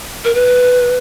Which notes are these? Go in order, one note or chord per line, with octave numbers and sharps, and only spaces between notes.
A#4
B4